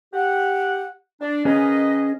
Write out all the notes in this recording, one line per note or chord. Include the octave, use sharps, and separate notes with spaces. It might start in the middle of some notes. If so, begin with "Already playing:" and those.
G4 F#5
D4
D#3 C#4 G#4 B4 D#5